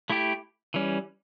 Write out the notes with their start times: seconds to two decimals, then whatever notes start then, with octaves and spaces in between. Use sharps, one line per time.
0.10 A3 E4 G4
0.74 E3 G3 C#4